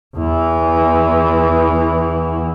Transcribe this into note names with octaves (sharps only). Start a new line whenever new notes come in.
E2 E3